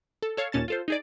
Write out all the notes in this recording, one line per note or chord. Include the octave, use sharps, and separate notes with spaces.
A4
A4 C#5 F5
D#2 A#2 C#4 A5 A6
F4 A4 C5
D#4 G#4 D5